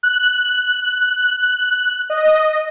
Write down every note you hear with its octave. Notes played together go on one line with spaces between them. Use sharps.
F#6
D#5